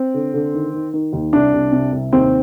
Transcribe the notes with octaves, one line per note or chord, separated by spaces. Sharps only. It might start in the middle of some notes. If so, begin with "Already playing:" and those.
Already playing: C4
D3
D3
D#3
D#3
D#3
D#2
C2 D4
C2
C3
C2
D#2 C4